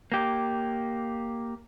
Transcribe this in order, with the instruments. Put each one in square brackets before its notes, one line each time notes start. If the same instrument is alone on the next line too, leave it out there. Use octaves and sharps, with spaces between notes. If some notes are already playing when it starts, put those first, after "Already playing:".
[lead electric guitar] A#3 G4